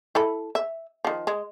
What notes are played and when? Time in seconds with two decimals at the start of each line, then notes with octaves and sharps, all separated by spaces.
0.15 E4 A4 B5
0.55 E5
1.05 D#3 F3
1.27 G#3